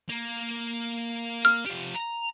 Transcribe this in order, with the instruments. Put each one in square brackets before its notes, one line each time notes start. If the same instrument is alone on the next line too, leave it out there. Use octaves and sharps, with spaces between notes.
[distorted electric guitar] A#3
[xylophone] F6
[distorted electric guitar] F3 G4
A#5